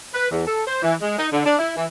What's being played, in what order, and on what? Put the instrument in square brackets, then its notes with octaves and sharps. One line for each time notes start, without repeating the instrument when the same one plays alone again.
[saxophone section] B4
E2
A4
C5
E3
G#3
D#4
D3
D4
E4
E3